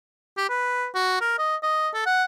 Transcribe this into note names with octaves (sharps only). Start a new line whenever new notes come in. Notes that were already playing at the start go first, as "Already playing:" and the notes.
G4
B4
F#4
A#4
D#5
D#5
A4
F#5